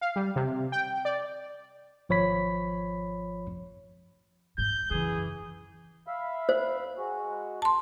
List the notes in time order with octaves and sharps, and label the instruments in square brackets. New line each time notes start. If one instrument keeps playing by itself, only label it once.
[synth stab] F5
G3
C3
G5
D5
[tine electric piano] G#1 F3 C#5 B5 B6
[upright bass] F2 G#2 [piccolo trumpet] G6
[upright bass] F#2 C#3 [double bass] E3 [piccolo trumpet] G#4
[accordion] E5 F5 B5
[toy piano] C5
[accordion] G#3 F#4
[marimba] A5 C6